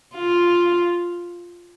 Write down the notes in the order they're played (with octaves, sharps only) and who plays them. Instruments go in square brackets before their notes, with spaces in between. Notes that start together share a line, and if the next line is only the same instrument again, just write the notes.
[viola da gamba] F4